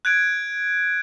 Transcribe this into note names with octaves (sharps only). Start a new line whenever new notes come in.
F#6 G#6 D7